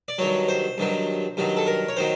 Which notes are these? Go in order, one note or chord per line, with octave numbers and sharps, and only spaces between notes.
D5
G2 D#3 F#3 C#5
C5
G2 D#3 F#3
G2 D#3 F#3
A4
A#4
C#5
D#3 F#3 C5